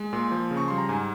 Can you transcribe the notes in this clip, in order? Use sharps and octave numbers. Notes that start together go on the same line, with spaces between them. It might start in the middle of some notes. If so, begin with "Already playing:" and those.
Already playing: G#3
A#2 C6
F3
C#3
C#6
G3 C6
A#5
G#2 G#5